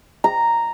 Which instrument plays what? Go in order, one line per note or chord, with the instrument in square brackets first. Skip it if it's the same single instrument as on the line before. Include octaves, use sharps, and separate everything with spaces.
[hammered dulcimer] A#5